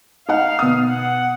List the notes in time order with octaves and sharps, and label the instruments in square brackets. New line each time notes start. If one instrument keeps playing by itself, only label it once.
[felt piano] D#4 F#5 [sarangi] F5
[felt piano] B2 D#6
[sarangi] F#5